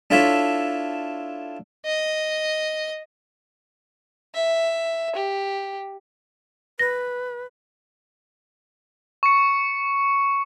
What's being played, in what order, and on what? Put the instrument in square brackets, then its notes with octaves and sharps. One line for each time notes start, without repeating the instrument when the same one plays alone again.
[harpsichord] D4 E4 F4 A4 C#5 E5
[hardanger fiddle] D#5
E5
G4
[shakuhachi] B4 [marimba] A#6
[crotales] C#6 C#7